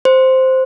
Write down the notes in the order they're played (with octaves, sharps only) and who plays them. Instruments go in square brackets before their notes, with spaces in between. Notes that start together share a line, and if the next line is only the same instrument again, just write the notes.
[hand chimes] C5